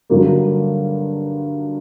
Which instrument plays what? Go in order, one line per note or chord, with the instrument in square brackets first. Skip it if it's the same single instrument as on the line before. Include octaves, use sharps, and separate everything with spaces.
[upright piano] G2 D3 F#3 A#3